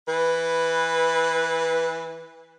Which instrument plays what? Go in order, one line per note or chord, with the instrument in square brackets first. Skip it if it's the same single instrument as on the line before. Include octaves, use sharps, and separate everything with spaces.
[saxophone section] E3 B4